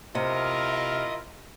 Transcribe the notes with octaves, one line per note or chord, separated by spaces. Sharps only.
C3 E4 F4 A#4 D#5